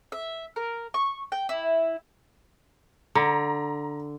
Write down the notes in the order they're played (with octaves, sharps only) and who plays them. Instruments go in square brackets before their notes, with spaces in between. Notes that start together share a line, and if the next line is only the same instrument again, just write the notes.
[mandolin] E5
A#4
C#6
G5
E4
[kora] D3 [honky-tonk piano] A#5